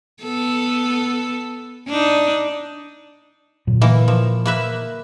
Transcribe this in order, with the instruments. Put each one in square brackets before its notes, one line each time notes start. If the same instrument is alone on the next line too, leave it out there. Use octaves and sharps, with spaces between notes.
[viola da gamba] B3 A4
D4 D#4
[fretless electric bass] A#2 D3 F#3
[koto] E3 A#3
F3
A#3 B4 E5